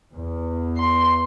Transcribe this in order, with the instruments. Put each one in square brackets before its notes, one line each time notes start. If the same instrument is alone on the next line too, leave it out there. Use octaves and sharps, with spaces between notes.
[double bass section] E2
[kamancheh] C6